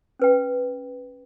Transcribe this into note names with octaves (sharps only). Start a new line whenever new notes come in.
C#4 B4 G5